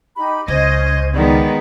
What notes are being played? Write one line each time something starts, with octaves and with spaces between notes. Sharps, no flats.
D#4 G4 B5
C#2 C#4 C5 D#5 G#6
D#3 G#3 B3 D5